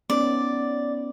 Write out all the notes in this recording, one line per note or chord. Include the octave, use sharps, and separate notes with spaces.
B3 C#4 D#4 D5